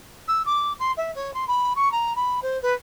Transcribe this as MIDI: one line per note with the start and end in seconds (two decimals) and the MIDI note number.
0.28 0.42 88
0.45 0.73 86
0.79 0.91 84
0.97 1.11 76
1.15 1.33 73
1.33 1.44 84
1.47 1.73 83
1.75 1.91 85
1.91 2.15 82
2.15 2.40 83
2.42 2.60 72
2.62 2.73 71